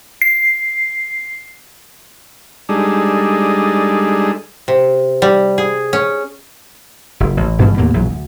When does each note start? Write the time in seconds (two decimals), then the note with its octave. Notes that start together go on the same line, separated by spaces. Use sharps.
0.22 C7
2.69 G3 G#3 D4 D#4 G#4 A4
4.68 C3
5.22 G3
5.58 G#4
5.93 C#4
7.20 F#1
7.37 A1
7.58 G#1 G2 B2 E3
7.77 D#2 A2 A#3 B3
7.94 A#1 F#2 E3 F#3
8.09 D2